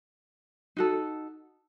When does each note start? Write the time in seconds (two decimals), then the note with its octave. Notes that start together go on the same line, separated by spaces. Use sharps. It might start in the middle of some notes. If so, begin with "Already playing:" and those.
0.77 D#4 F#4 A4